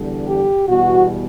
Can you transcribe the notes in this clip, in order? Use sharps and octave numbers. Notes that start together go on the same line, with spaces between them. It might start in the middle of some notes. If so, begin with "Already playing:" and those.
Already playing: E2 D3 G3
G4
E2 B2 G3 F#4